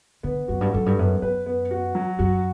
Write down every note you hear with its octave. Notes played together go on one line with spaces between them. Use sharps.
D3 B3
F#2 F#4
G2
F#2 A4
G2
F#2 B3
F#2 B4
B3
F#4
F#3
F#2 F#4